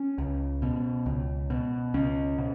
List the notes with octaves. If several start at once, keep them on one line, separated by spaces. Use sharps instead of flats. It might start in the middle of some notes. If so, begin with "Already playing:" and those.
Already playing: C#4
C#2
B2
C#2
B2
C#2 C#4
B2